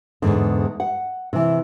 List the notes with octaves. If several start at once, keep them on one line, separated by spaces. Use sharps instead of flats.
E2 G#2 D3
F#5
C3 E3